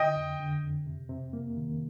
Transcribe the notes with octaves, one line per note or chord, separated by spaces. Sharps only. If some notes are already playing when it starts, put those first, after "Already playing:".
Already playing: D3 D#5 G5
F2
D3
F2
C3
C3
A#3
D#3